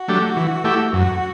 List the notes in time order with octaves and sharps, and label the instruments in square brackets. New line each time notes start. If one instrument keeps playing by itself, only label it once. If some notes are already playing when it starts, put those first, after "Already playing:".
Already playing: [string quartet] F#4
[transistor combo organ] F#3 A3 D4 G4
E3
A3 E4 G4
[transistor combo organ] F#2 [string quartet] F#4